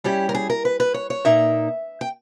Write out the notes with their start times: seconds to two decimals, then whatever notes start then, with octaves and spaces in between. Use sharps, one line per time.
0.04 G3 C#4 E4 G4
0.29 A#4
0.34 G#4
0.50 A#4
0.65 B4
0.80 B4
0.94 C#5
1.10 C#5
1.25 A#2 A#3 D#4 E5
2.01 G5